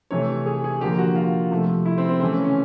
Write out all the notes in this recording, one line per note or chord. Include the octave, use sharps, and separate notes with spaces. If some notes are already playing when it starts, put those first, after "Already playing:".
C3 E3 A3 C#5
G#4
G#4
D3 F3 A#3 G4
F#4
F4
C3 F3 A3
E4
C4
C4
C#3 E3 A3 C4
C#4
C#4